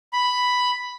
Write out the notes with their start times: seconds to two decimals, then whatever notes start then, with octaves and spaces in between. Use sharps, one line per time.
0.13 B5